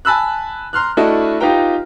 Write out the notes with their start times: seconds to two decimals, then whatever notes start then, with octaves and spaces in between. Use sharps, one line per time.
0.05 G#5 A5 B5 E6 F#6
0.73 A#5 C6 F6 F#6
0.97 A3 D4 E4 F#4 A4 D#5
1.40 D#4 F4 G4 B4 G5 A#5